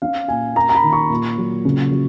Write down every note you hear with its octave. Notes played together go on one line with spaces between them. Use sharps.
C#4 F5
A#2 G#5
A#3 A#5
A#5
B5
D#3
C#6
A#2
F#3
C#3
F#3